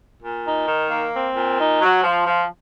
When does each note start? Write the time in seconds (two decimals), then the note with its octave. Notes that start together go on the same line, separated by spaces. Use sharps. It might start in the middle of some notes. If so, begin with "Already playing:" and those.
0.23 A#2
0.46 D#4
0.68 D#3
0.90 A#3
1.13 C4
1.36 A#2
1.58 D#4
1.81 F#3
2.04 F3
2.26 F3